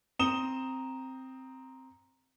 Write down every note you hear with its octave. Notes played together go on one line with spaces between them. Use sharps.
C4 A#5 D#6 E7 G7